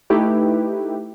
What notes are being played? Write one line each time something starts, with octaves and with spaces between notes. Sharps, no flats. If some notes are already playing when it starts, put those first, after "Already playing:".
A3 D#4 E4 G4 B4